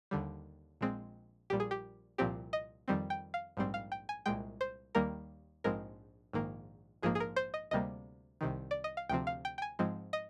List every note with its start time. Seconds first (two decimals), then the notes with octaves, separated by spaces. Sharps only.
0.11 D#2 D3 G3
0.81 A#1 A#2 G#3 C4
1.50 A#1 A#2 G3 G4
1.60 G#4
1.71 G4
2.18 C2 A#2 F3 C4 G4
2.53 D#5
2.88 F2 D#3 G3 C4
3.10 G5
3.34 F5
3.57 A#1 G#2 G3 C4
3.74 F5
3.92 G5
4.09 G#5
4.26 C2 A#2 G#3 G5
4.61 C5
4.95 D#2 D#3 G3 A#3 A#4
5.64 A#1 G#2 F3 G#3 C4 A#4
6.33 A#1 G#2 D#3 A#3
7.03 A#1 G#2 F3 A#3 G#4
7.15 G#4
7.20 A#4
7.36 C5
7.54 D#5
7.71 D2 C3 G3 A#3 D#5
8.41 C2 C3 D#3
8.71 D5
8.84 D#5
8.97 F5
9.09 D2 C3 F3 C4 G5
9.27 F5
9.45 G5
9.58 G5
9.62 G#5
9.79 G#2 F3 G#3 C4
10.13 D#5